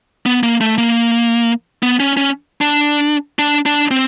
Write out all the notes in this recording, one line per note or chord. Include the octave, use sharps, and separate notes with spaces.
B3
A#3
A3
A#3
B3
C#4
C#4
D4
D4
D4
C4